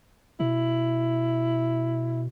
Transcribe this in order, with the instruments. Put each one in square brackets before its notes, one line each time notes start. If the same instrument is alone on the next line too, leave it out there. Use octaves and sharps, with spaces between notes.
[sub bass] B2 [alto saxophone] E4